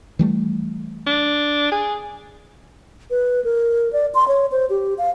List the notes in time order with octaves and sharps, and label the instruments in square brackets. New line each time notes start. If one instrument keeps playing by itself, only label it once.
[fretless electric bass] E3 G3 A3
[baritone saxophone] D4
G#4
[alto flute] B4
A#4
D5
C6
C#5
C5
G4
F5